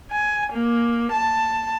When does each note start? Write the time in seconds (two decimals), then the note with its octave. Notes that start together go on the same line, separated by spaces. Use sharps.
0.12 G#5
0.53 A#3
1.12 A5